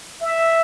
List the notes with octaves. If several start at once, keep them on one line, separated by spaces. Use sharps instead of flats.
E5